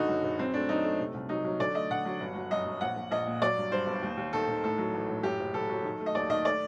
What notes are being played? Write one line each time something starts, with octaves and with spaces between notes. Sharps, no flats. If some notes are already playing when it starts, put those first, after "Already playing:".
Already playing: F#1 D3 D#4 F#4
F#2
F#1
F#2 C4
A3 D4
F#2 D#4
A3
C3
C2
F#3 D#4
F#3
D3 D5
A3 D#5
D3 F#5
F#3
G1
F#3
F#2 D#5
F#3
A#1 F#5
A#1
A#1 D#5
A#2
F#3 D5
G2
G2 C5
G1
D#2
D#2
D#3 A4
D#3
A2 A4
F#3
A1
A2
F#2 G4
F#1
F#1 A4
F#3
D#3
A3
D#5
D#2 D5
D#3 D#5
A3 D5